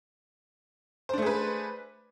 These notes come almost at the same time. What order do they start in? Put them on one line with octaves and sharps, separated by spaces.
C5 D4 A3 G#4 B4